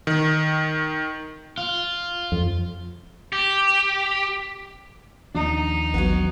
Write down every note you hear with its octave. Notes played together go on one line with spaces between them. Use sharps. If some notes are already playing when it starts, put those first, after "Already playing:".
D#3
F4
F2
G4
D#2 F3 D4 D#4
A1 F#3 B3